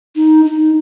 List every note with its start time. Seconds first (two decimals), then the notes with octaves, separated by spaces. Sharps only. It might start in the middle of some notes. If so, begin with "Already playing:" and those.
0.16 D#4
0.45 D#4